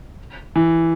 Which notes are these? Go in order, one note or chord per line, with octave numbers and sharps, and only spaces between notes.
E3